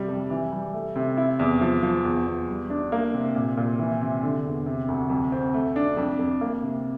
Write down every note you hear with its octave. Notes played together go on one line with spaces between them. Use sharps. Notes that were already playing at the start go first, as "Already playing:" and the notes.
Already playing: C3 G3
F2
E3
G3
A3
C3
E4
E2
F3
F3
E2
E2
G3
D4
A#3
C3
A#2
A#2
E3
C3
D3
E2
C3
D2
F2
C4
A3
D4
F2
F2
A#3
C3